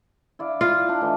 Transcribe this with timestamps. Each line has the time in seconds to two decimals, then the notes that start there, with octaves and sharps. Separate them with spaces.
0.39 E4 D5 F5
0.61 F4
0.89 D4 D#4
1.01 E3 A3